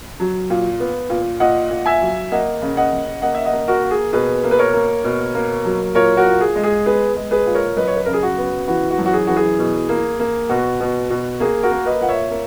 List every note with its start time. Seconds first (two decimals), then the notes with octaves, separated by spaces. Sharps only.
0.20 F#3
0.50 A#2
0.80 B3
1.10 A#2
1.40 A#2 D#5 F#5
1.71 A#2
1.86 E5 G#5
2.01 F#3
2.31 A#3 D#5 F#5
2.62 C#3
2.77 D#5 F#5
2.92 C#3
3.22 A#3 D#5 F#5
3.34 E5
3.45 D#5 F#5
3.53 A#3
3.68 F#4 A#4
3.83 A#3
3.91 G#4
4.13 B2 G#4 B4
4.43 A#3
4.51 B4
4.59 A#4 C#5
4.73 A#3
5.04 B2
5.35 A#3
5.65 F#3
5.95 A#2 A#4 C#5
6.17 F#4 A#4
6.26 A#2
6.41 G#4
6.56 G#3
6.63 G#4
6.86 B3 G#4 B4
7.16 G#3
7.31 G#4 B4
7.46 A#2
7.54 A#4 C#5
7.77 F#2 B4 D#5
7.88 C#5
7.97 B4
8.05 C#3 A#4
8.13 G#4
8.23 F#4
8.38 B3
8.68 E3 F#4
8.91 F#4
8.98 F#2
9.06 F#4
9.13 G#4
9.27 E3 F#4
9.37 G#4
9.59 B2
9.89 A#3
10.20 A#3
10.49 B2 F#4
10.80 B2
11.10 B2
11.40 A#3 G#4
11.63 F#4 A#4
11.71 A#3
11.86 B4 D#5
12.01 A#2 F#5
12.08 C#5 E5
12.31 A#3